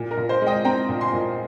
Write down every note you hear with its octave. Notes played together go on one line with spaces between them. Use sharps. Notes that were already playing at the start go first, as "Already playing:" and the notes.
Already playing: A#2
A#4
A#2
C5
G#3
D#5 G5
C4 G5 A#5
A#2
G#5 C6
A#2